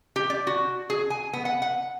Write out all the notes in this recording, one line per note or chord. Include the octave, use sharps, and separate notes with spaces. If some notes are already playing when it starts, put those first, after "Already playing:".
G4
D5
F#4
G#4
G#5
B3
F#5
F#5